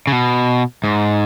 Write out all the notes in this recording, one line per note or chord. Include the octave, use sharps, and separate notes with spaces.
C#3
B2
G#2